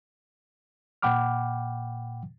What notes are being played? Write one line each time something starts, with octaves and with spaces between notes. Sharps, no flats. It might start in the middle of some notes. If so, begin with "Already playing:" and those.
A#2 F#5 G5 B5 D6 F6